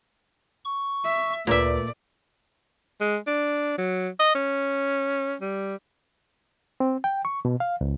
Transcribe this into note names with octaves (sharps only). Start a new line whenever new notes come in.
C#6
E5
D2 A#2 A3 F4 A#4 B4 D5 E5
G#3
D4
F#3
D#5
C#4
G3
C4
G5
C#6
B2
F5
C#2